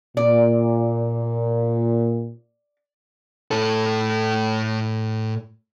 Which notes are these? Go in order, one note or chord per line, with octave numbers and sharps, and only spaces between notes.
A#2 D5
A2 A4